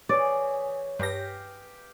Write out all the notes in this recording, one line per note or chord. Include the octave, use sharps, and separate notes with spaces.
E3 G#4 C#5 D5
G2 G4 F5 G5 A#6